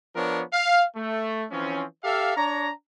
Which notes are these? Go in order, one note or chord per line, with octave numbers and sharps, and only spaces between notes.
F3 B3 D4 A#4 C#5
F5
A3
E3 F3 C4 C#4
G4 A4 E5 F5
D4 C#5 A#5